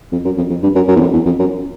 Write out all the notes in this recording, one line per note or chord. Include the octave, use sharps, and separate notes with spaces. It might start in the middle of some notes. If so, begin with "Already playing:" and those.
F2
F#2
F2
F2
G2
F#2
F#2
E2
F2
E2
F2
F#2